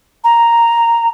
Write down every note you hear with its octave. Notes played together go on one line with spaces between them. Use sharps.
A#5